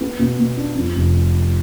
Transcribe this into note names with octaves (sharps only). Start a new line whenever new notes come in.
B3
B2
B2
D4
F2
F1